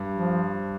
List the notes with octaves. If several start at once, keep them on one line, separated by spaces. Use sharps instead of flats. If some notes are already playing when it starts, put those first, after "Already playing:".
Already playing: G2
F3